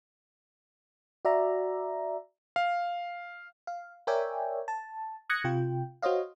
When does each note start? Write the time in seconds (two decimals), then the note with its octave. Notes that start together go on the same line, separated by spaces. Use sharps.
1.25 F#4 D5 E5 A#5
2.56 F5
3.67 F5
4.07 A#4 C#5 D5 E5 G5 G#5
4.68 A5
5.29 D#6 F#6 G#6 A#6 C#7
5.44 C3 F4 G5
6.02 F#4 C5 C#5 D#5 F5